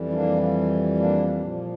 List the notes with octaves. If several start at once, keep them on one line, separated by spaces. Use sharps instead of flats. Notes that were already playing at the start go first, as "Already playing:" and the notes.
Already playing: F2 E3 G3
E4
A#3 D4
A#3 D4
A#2 F3